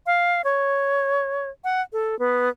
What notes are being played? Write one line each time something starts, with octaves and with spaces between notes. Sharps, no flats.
F5
C#5
F#5
A4
B3